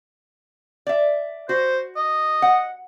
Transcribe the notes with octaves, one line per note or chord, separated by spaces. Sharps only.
D5 E5
F#4 C5
D#5
F#5